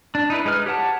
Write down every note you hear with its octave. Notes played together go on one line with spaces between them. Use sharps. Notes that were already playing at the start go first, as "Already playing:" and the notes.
D4
D#4 E4 B4
G#3 D#4 B4 F6
G4 C#5 F#5 A5